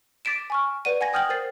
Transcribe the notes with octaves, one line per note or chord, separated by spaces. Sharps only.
D6 A6 B6 D7 E7
G#5 C#6 F6
B4 D5 F#5 D#7
F#5 G#5 G#6 A#6
G5 D#6 F6 G6 G#6 F#7
A#4 C5 A6 C7